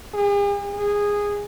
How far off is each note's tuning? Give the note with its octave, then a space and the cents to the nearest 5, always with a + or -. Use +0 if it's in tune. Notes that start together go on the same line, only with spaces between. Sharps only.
G#4 -45
G#4 -15